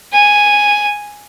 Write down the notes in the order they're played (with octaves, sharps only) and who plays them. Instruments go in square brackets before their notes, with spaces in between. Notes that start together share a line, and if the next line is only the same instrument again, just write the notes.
[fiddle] G#5